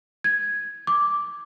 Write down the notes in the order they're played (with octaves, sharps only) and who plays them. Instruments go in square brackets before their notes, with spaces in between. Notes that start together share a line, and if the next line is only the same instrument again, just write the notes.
[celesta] G#6
D6